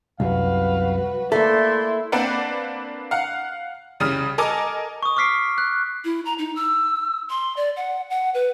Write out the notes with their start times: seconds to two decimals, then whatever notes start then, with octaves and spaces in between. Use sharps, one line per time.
0.20 C2 F#2 F#4 B4 F5
1.32 A3 A#3 E4 A4 D5 C6
2.12 A#3 C4 D4 B4 D5 F#5
3.11 F5 F#5
4.00 C2 C#3 G3 D#6 F6
4.38 A4 A#4 D#5 G#5 D6
5.03 C#6 D#6
5.16 C#6 D6 F6 B6 C7 D7
5.58 F#6
6.04 E4
6.25 A#5
6.38 D#4
6.56 E6
7.30 C6
7.57 D5
7.76 F#5
8.10 F#5
8.34 B4